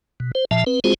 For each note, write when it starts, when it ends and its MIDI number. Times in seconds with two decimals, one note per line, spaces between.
0.20 0.32 47
0.35 0.45 72
0.51 0.64 46
0.51 0.64 53
0.51 0.64 76
0.51 0.64 81
0.66 0.80 60
0.66 0.80 71
0.84 0.94 56
0.84 0.94 60
0.84 0.94 65
0.84 0.94 66
0.84 0.94 68
0.84 0.94 72